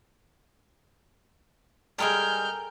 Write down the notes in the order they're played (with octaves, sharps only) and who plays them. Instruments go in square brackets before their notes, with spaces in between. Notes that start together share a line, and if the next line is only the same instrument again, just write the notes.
[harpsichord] G3 G#3 [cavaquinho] A4 A#4 G#5 [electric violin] F6 G6